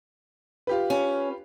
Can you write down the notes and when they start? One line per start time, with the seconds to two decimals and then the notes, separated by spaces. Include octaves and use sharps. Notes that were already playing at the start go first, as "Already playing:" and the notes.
0.67 F4 G4 B4
0.90 C#4